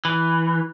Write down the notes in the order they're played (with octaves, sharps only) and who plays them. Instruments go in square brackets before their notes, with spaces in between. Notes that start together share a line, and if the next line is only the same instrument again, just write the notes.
[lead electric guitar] E3